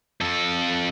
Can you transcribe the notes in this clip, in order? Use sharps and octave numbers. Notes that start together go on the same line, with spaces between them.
F2 A4